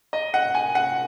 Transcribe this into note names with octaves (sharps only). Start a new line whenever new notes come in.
D#5
F#5
G#5
F#5